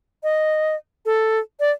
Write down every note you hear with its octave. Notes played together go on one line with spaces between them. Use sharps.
D#5
A4
D5